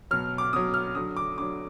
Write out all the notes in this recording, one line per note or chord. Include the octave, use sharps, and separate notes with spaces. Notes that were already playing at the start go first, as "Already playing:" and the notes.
B2 F#3 F6
D6
B2 F#3 D#6
F6
D3 F#3 D#6
D6
D3 F#3 D6